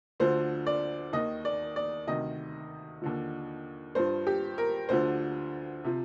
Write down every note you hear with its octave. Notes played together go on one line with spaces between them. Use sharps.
D2 D3 F3 C5
D5
D#2 D#3 D#5
D5
D5
D2 C3 D#3 D#5
D#2 D3 F3
G2 F3 C5
G4
A#4
D2 D3 F3 C5
C3 F3